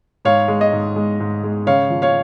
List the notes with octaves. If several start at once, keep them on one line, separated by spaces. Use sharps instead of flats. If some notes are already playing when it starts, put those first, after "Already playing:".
G#2 C#5 F5
G#3
D#5
G#2
G#3
G#2
G#3
C#3 C#5 F5
F3
C#5 F5